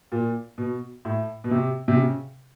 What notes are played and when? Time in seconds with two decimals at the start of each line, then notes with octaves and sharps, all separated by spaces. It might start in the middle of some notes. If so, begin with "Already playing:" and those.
0.12 A#2
0.58 B2
1.05 A2
1.44 B2
1.51 C3
1.88 C3
1.97 C#3